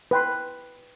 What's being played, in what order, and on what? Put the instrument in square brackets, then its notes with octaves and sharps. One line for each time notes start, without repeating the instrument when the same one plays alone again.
[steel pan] B4 G5 C6